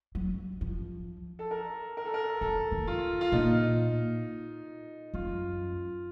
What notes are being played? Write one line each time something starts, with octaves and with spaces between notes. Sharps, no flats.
F#3
F3
A4
A#4
A#4
A4
A#4
F3 A4
D#3
F4
F4
A#2 D#4
F#2 F4